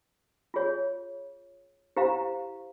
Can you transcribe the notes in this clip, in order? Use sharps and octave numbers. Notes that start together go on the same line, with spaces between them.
F4 G#4 C#5
E4 G4 C5 F5 A#5